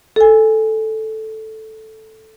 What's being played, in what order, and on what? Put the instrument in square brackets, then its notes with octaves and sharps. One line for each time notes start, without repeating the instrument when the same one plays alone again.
[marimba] A4 G#5